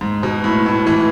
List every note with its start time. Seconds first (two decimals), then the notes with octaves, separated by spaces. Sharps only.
0.01 G#2
0.23 B2
0.44 A2
0.66 A2
0.87 E3